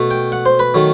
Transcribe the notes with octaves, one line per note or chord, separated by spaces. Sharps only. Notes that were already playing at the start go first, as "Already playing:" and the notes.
Already playing: B2 A3
G5
F#5
C5
B4
D#3 F#3 A3